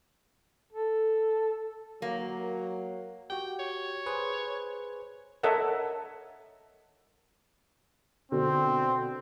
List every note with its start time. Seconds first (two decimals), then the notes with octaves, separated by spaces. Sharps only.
0.73 A4
2.02 F#3 A#3
3.30 F#4 G4 G5
3.60 C#5
4.06 G#4 B4 C5
5.43 A4 A#4 C#5 D#5 E5 F#5
8.32 B2 D3 C4 F#4